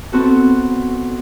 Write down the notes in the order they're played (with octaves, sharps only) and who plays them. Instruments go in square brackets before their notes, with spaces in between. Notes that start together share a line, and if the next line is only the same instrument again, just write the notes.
[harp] B3 C4 F#4 A4